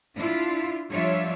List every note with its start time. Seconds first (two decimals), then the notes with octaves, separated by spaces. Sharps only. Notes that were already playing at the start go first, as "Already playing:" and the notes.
0.15 D4 E4 F4
0.92 F3 G3 D4 F4 C#5 E5